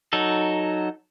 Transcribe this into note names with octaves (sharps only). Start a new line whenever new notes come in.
F#3 D#4 A4